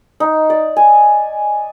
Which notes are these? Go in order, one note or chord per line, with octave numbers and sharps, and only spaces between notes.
D#4
D5
G#5